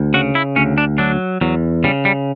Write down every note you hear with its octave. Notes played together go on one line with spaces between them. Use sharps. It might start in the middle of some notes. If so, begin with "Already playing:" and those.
Already playing: D2
C#3 F#4
E4
D2 C#4
D4
F#3 D4
E2 F#3
C#3 G3
G3